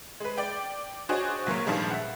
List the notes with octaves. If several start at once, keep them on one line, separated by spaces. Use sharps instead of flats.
G#3 B4
D5 G5
D4 F#4 G#4 C5 C#5 D#5
A#1 F#3 A#3 C#5
G2 A#2 D#3 F3 G3 G#3
E5 F#5